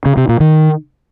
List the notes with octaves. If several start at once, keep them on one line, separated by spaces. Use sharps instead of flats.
C#3
C3
A#2
D#3